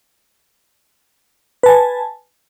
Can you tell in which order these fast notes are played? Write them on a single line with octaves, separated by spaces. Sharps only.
B4 A5 G#5